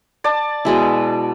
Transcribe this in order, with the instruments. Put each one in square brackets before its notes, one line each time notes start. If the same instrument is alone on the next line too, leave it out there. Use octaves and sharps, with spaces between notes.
[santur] D5 A5
[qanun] B2 G#3 E4